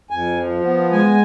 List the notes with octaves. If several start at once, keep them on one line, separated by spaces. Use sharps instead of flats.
F2 G#5
F3
B3
G#3 G#5